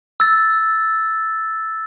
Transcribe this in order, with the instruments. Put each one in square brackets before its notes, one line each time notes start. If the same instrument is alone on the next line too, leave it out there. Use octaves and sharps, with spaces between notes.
[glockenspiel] E6 A6